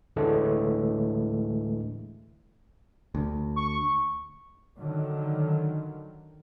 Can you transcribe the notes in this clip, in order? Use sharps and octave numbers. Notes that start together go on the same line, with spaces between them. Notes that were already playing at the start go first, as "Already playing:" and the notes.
D2 A2 D3 E3 G#3 A3
D2
C#6
D3 D#3 F#3